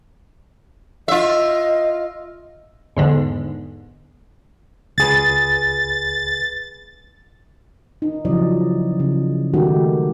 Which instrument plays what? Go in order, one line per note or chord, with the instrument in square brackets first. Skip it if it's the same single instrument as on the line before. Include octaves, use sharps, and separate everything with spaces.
[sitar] F4 E5 [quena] D#5
[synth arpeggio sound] E2 G#2 D3
[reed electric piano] C#2 G#4 B4 [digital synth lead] A6
[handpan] D#4
C#3 F3 F#3 E4 D5 D#5
C#3
D#3 G#3 A3 D#4 F#4 G4